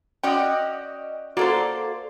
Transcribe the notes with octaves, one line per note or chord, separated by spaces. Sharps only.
C#4 F#4 D5 D#5 G5
A#3 F#4 A4 C5 D5